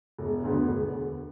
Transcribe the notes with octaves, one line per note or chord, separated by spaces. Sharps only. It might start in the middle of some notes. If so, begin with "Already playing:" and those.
E1
D2 D3 B3
E1